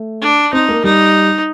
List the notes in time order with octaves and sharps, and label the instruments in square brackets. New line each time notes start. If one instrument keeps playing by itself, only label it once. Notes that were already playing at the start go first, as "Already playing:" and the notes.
Already playing: [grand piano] A3
[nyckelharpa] D4
[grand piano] C4 [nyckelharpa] D#4
[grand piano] A#3
[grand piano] G3 [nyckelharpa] D#4